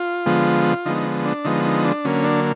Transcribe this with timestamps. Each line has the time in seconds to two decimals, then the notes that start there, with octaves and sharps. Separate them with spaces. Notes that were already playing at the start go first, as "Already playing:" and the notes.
Already playing: F4
0.26 D3 F3 G#3 B3
0.85 D3 F3 G#3 B3 D#4
1.26 D4
1.45 D3 F3 G#3 B3 D#4
1.65 D#4
1.85 D4
2.05 D3 F#3 A#3 C#4
2.24 D4